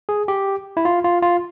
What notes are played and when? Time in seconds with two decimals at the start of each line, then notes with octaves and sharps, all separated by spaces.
0.09 G#4
0.28 G4
0.77 E4
0.85 F4
1.04 F4
1.22 F4